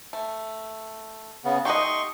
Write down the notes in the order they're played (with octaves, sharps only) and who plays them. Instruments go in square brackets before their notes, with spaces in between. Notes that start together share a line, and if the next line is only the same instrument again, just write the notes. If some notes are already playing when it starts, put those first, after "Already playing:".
[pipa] A3
[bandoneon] C#3 B3
[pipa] A3 D#4 F#5 [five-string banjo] G4 D#5 [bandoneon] C6 C#6